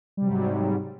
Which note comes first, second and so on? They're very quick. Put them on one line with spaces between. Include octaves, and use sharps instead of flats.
G3 C3 F#3 G#2